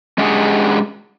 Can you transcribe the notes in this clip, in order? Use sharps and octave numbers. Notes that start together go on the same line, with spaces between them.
G#3 C#4 D4 G4 G#4 F#5